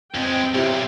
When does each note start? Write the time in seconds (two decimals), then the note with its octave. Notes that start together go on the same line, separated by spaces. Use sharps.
0.15 F2 G#3 C4 G5
0.54 B1 C3 E4 G4